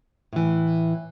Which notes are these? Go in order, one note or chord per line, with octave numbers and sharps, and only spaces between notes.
A2 E3